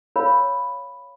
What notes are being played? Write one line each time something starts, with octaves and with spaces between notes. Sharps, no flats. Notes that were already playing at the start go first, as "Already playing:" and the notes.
A#4 C#5 F5 B5